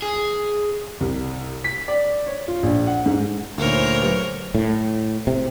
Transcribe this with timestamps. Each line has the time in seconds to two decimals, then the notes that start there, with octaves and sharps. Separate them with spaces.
0.02 G#4
1.00 C2
1.64 B6
1.88 D5
2.27 C#5
2.48 F4
2.63 A#1
2.87 F#5
3.06 G#2
3.58 D2 A#2 D#4 A#4 C5 C#5
4.01 F#3 G4 B4
4.55 A2
5.27 C3